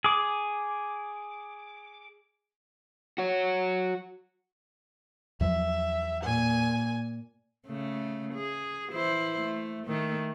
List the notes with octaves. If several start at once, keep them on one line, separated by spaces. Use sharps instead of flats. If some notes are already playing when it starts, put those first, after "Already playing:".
G#4 D6
F#4 C#5
E2 F3 F#3 E5
A#2 G#5
C#3 A3
G#4
E3 E4 C5
A3
D#3 A3